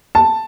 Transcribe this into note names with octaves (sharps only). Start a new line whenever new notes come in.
A5